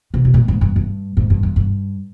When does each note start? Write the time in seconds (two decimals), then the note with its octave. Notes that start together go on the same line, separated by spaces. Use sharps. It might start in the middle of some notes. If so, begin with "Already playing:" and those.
0.14 C3
0.25 C3
0.34 A#2
0.48 G#2
0.61 G2
0.76 G2
1.17 G#2
1.30 G2
1.43 F2
1.56 G2